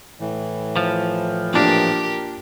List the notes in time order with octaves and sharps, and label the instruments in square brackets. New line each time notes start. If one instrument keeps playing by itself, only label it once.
[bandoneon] A2 E3
[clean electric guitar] F3
[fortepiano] A#2 D4 [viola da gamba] G4 A#4